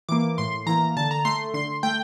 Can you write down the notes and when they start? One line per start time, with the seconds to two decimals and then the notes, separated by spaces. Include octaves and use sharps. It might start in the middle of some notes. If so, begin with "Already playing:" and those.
0.09 E3 A#3 D6
0.38 A2 C6
0.66 E3 A#3 A#5
0.97 D3 A5
1.11 A#5
1.25 A3 C6
1.54 D3 C6
1.83 A3 G5